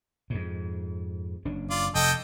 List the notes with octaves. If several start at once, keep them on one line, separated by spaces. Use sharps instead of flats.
F2 G#2
F#1 C#4 D4
F4 D5
F1 A4 D#5 G5